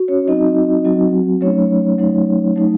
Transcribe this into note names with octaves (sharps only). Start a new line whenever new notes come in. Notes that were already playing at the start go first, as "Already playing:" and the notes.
Already playing: F#4
C#4 C#5
F#3 C4 D#4 F#4 D#5
F#3 C4 F#4
F#3 A3 C#4 D#4 C#5
F#3 A3 D#4
F#3 A3 D#4